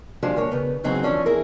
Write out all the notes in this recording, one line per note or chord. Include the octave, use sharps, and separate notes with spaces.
F3 G3 G#3 D4
D#2 A#4 C#5
C#3 B3
C#3 E3 F#3 C4 D#4 G#4
E3 F3 C#4 D4
E4 G#4 A#4